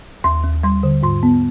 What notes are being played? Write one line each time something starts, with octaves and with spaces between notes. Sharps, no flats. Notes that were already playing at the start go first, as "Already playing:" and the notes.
D#2 C6
D#2
G3 C6
D3
G#2 C6
B3